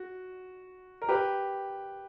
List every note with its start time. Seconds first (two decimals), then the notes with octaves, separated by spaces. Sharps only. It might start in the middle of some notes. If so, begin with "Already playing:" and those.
Already playing: F#4
1.02 A#4
1.09 G4 B4